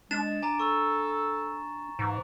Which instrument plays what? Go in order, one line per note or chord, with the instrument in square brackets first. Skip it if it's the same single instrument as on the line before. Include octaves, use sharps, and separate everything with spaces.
[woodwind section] G#3 [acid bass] D4 [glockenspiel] A6 E7
[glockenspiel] G#5 A#5 [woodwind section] D6
[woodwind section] A4 [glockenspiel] C#6
[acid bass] G#2 [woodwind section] E3